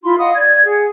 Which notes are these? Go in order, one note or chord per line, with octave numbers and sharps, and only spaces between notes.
E4 F4 B5 C6
D#5 F5 F#5 D#6
D5 G#6
G#4 F#5